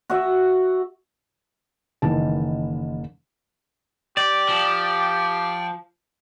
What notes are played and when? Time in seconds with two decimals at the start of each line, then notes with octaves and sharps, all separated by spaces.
0.10 F#4 E5
2.02 F#1 D#3 E3 A5
4.17 G4 D5 G5
4.49 F3